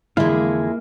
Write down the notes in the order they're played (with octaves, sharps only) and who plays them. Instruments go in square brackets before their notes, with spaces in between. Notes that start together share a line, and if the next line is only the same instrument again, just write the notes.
[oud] F2 G#3 [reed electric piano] D3 E3 [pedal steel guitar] A#3 F5 [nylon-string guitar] E4